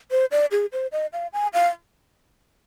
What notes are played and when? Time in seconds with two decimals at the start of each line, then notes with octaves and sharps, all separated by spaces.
0.11 C5
0.31 D5
0.51 G#4
0.73 C5
0.92 D#5
1.13 F5
1.33 G#5
1.54 F5